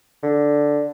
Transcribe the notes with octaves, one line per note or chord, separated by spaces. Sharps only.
D3